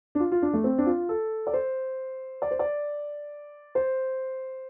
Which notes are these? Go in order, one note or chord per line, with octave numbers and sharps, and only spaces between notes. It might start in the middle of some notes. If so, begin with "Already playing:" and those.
D4
F4
F4
D4
A3
C4
D4
F4
A4
D5
C5
D5
C5
D5
C5